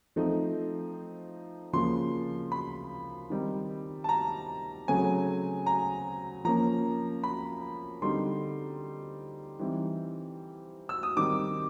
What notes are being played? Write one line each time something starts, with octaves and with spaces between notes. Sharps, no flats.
F3 A3 C4 D#4
C#3 F3 A#3 C6
B5
D#3 G3 C4 D#4
A5
A#5
C#3 F#3 A3 C4 G#5
A#5
F3 A#3 C#4 A#5
B5
D3 G3 C4 D#4 C6
E3 G3 C4 D#4
E6
D#6
D#3 G3 C4 D#4 D6